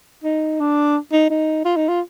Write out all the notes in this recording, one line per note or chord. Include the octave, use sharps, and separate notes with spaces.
D#4
D4
D#4
D#4
F4
D#4
F4